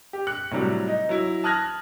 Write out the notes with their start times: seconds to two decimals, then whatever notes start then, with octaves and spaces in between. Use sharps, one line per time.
0.13 G4
0.27 F#6 C#7
0.51 A2 C3 F#3 G3
0.88 D#4
1.09 F#3 E4
1.44 A5 D#6 F6 F#6 G#6 A#6